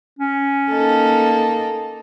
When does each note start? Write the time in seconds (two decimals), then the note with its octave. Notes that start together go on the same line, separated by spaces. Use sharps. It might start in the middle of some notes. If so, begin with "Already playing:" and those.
0.19 C#4
0.71 A#3 D#4 A4